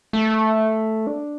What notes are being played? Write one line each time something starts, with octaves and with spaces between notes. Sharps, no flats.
A3
D4